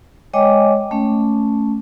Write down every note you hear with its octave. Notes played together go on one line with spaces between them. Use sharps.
G#3 C#5 D#5 G5 G#5 D6
A3 C#4